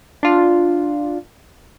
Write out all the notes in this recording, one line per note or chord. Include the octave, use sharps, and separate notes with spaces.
D4 F4